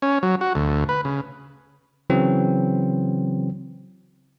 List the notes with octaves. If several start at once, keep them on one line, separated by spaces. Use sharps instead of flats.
C#4
F#3
F#4
D2
B4
C#3
C#3 E3 F#3 C4